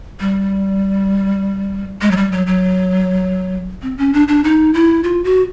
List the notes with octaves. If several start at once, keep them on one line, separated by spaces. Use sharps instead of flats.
G3
G#3
F#3
G3
F#3
F#3
C4
C#4
D4
D4
D#4
E4
F4
F#4